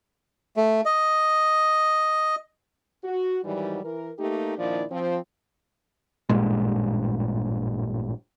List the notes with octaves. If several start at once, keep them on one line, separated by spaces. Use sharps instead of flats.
A3
D#5
F#4
G#2 D#3 E3 F#3 G3
E3 A#4
A3 A#3 D#4 G4
A#2 D#3 F3 D4 E4 D5
F3 C4
A1 G2 A#2 G#3